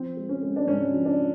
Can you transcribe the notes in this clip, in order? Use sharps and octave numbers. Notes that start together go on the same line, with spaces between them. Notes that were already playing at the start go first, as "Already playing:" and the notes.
Already playing: F3 C4
G#3
C#4
G#3
D4
G#2 C#4
F3
D4